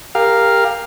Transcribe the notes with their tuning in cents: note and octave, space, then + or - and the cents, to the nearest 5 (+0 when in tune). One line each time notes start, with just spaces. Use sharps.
G4 +25 A#4 +0 F5 +0